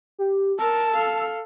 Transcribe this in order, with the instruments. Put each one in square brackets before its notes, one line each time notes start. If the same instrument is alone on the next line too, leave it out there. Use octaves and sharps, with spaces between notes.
[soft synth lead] G4
[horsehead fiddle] A#4 [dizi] A5 [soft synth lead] E6
[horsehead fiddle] A4 F5